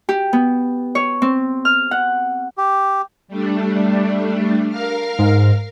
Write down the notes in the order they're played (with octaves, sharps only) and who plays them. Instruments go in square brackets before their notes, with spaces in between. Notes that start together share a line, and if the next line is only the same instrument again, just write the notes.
[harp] G4
B3
C#5
C4
F6
F#5
[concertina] G4
[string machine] G3 A3 D4
A#4 F5 F6
[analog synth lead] G#2